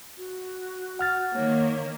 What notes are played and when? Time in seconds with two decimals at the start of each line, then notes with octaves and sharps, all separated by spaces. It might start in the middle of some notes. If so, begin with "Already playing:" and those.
0.17 F#4
0.99 F#5 F6 A6
1.34 D#3 A#3 C#5